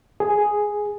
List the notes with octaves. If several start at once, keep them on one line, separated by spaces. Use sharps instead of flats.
G#4